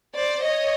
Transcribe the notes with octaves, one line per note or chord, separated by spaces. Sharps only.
C5 D5
C#5 D#5